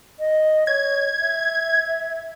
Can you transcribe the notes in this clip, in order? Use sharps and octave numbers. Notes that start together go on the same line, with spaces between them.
D#5
C#5 G#6
E5